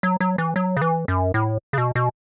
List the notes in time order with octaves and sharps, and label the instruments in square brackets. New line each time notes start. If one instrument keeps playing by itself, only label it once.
[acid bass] F#3
F#3
E3
F#3
C#3
E3
F#2
A2
C#3
B2
B2